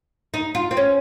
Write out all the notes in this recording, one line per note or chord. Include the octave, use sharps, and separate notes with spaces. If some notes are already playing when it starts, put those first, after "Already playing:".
D#4
F4
C4
C#4